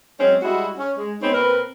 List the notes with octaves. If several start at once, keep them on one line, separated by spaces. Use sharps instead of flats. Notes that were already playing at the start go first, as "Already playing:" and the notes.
F#3 G#3 C4 C#4
G3 G#3 E4 F#4
C#4
G#3
G#3 B3 C4 D#4 C#5
A#2 C4 A#4 B4